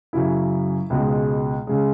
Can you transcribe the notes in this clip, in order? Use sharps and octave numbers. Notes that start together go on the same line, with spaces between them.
F#2 C#3 F#3 E4
C#2 B2 G#3
C#3 G#3